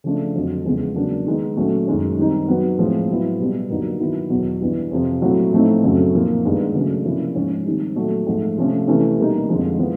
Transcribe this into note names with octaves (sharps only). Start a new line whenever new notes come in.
C#3 F3 A3 D4
F2 D3 F#3
E2 C#3 F3 G#3 B3
C#3 F#3 A#3 D4
D#3 G#3 B3 D#4
A#2 F#3 A3 C#4
F#2 D#3 G#3 C#4
D#3 G3 C4 D#4
D#3 F#3 B3
A2 F3 G#3 C4
A2 F#3 B3 E4
B2 G3 B3
G2 D3 F#3 A#3 D#4
D#3 F#3 B3 E4
E2 B2 F#3 B3
G2 E3 G3 B3
F2 C3 F3
A#2 F#3 A3 C4 E4
A2 F3 A3 C4 D#4
F#2 C#3 F#3 A3 C4
A#2 F3 A#3 D#4
G2 D#3 G#3 B3 D#4
C#3 F#3 A3 D4
C3 F3 A#3 C#4 E4
G#2 F3 G#3 C#4
D#3 G3 C4 D#4
A#2 F#3 A3
G#2 F3 A3
C3 F3 A3 C#4
C3 E3 A3 C#4 E4
B2 G3 A#3 D#4
F2 D3 F3 G#3
F3 G#3 B3 E4